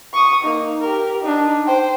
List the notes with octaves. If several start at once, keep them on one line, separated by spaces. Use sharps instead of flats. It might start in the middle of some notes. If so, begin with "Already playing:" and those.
C#6 D#6
A#3 D#4
G4 A#4
D4 D#4
C5 G5